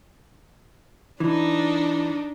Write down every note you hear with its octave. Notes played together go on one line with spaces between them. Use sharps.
E3 D4 D#4